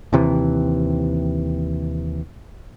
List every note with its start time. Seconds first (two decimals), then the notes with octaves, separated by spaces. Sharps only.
0.13 D#2 C3 E3